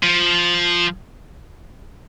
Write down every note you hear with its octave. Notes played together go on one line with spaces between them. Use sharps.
F3